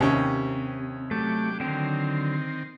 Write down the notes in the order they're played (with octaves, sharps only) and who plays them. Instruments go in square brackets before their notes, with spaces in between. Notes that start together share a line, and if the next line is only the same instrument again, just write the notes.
[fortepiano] D#2 C#4 [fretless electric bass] C3
[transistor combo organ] F#3 G4 D6 [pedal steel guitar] A3
[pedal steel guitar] D3 F#3 G5 [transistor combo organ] D#3 C4